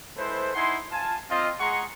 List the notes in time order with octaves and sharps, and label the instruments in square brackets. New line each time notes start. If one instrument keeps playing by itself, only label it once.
[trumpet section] G#3 E4 A4 B4 C5
D#4 E4 F#5 G#5 C6
F4 G#5 A5
C4 F4 D#5
G#3 G#4 F#5 A#5 C6 C#6